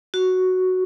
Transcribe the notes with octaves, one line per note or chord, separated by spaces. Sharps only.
F#4